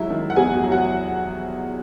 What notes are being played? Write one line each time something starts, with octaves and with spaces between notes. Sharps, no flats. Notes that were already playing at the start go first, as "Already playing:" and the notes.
Already playing: F#3 G#3 E4 E5
D#3
F#5
E2 G#4 G#5
F#4 F#5
F#3
F#4 F#5